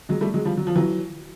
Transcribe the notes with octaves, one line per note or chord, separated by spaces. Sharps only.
F#3 G#3
G3 A3
F#3 G#3
F3 G3
F#3
F3
E3 F#3